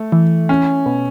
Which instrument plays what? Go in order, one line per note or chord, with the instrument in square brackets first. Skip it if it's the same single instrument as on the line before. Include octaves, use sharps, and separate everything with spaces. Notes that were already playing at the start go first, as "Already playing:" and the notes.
Already playing: [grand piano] A3
[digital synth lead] E3
[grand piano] C#4
[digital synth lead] B2